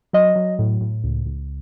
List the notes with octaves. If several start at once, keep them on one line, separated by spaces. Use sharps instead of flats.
F#3 D#5
F#3
A2
A2
C#2
C#2